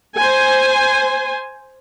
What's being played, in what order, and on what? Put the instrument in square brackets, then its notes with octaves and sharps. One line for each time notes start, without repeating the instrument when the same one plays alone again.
[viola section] C5 G#5